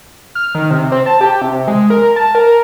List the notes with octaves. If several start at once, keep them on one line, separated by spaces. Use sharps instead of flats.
F6
D#3
C3
C4
A5
G4
C3
G#3
A#4
A5
A#4